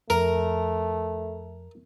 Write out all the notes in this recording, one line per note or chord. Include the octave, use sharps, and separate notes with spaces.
F2 A3 A#4